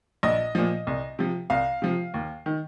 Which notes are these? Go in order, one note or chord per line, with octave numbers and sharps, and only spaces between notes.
A#1 D#5
A#2 F3
C2
C3 F3
C2 F5
C3 F3
D#2
D#3